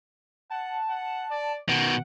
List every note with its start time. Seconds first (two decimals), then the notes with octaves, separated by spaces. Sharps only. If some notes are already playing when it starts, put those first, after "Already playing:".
0.50 F#5 A5
0.89 F#5
1.31 D5
1.69 B2 D#3 F#5 D7